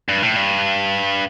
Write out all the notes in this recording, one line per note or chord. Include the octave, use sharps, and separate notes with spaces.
G2
A2
G2